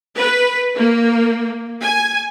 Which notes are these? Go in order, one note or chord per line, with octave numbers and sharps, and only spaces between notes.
B4
A#3
G#5